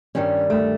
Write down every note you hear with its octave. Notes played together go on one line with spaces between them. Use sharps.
G2 D#3 G3 C#4
A3